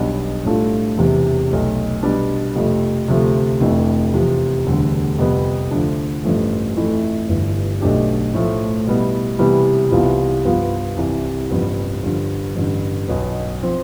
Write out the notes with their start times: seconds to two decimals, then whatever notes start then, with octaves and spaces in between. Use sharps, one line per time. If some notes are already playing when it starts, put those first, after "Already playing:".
Already playing: B1 B2 G3 B3 D4
0.45 A2 G3 D4 F4 A4
0.97 E1 E2 C3 E3
1.50 B1 B2 A3
2.03 B2 G3 B3 D4
2.55 F2 C3 F3 A3
3.08 D2 C3 F3 A3
3.60 F1 F2 E3 A3 D4
4.14 E2 C3 F3
4.66 E1 D2 D3 G3
5.18 F2 C3 G3 B3
5.71 D2 D3 F3 A3 D4
6.24 A1 G2 F3 A3
6.76 F2 E3 A3 E4
7.28 G1 G2 E3
7.81 B1 B2 A3 D4 G4
8.34 A2 F3 A3
8.87 B2 G3 B3 E4
9.39 C3 E3 G3 B3
9.92 C2 C3 E3 B3 F4
10.44 G2 F3 B3 F4
10.97 C2 C3 E3
11.50 A1 G2 F3 B3
12.03 G2 D3 F3
12.55 A1 G2 D3
13.08 B1 B2 B3
13.62 F3 C4